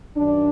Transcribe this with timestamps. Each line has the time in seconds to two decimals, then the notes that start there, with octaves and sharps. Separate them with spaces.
0.17 F#2 D#3 D4